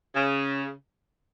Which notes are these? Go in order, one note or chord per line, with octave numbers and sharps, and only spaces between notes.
C#3